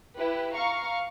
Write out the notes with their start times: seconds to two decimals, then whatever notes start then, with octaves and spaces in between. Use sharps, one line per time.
0.17 E4 G4 B4
0.55 F5 A#5 C#6